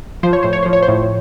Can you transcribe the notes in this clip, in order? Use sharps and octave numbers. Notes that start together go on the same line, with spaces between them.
F3 C5
C#5
A2 C5
C#5
F3 C5
C#5
C5
A2